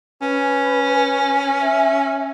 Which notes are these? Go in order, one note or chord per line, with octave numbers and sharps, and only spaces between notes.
C#4 B4
E5